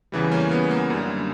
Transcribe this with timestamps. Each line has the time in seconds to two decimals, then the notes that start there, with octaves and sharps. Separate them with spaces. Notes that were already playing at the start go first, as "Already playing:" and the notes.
0.12 E2 C#3 E3 G3
0.32 A#3 C#4
0.51 B3
0.71 A#3
0.90 F#2 D3 G3